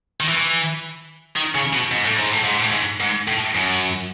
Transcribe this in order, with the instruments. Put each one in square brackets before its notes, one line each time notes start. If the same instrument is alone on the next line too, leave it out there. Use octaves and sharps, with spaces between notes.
[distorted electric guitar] D#3
E3
D#3
C#3
B2
G#2
A2
G#2
A2
G#2
A2
G#2
G#2
A2
F#2